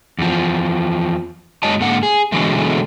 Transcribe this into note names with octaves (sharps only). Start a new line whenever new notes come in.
E2 F3
F#2 F#3 G#3 C#5 D#5 A5
G#2 D3 A#3 F#5
G#4
B2 D3 E3 F#3 G#3 A3